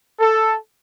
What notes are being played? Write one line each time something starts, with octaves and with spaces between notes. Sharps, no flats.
A4